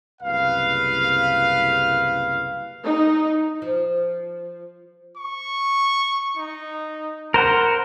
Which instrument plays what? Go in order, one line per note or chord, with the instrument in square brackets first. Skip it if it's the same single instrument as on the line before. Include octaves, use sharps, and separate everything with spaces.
[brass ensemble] F#1 C2 B4 F5
[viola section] D#4
[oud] F3
[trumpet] C#6
D#4
[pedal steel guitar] A#4 C5 F#5 [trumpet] B5